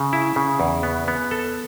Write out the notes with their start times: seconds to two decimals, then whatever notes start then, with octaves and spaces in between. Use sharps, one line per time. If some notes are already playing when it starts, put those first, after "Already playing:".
Already playing: C#3
0.13 E4
0.36 C#3
0.60 E2
0.83 B3
1.08 B3
1.31 A4